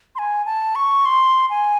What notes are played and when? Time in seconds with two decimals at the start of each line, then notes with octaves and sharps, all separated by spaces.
0.15 C6
0.19 G#5
0.46 A5
0.75 C#6
1.05 C6
1.50 G#5